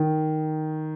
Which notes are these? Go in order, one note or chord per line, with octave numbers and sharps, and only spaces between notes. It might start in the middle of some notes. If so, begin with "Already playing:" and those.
Already playing: D#3